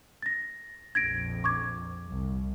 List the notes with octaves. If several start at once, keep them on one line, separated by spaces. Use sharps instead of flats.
A6 A#6
A#1 F2 G#6 A#6 D7
C#6 D6 G#6
C2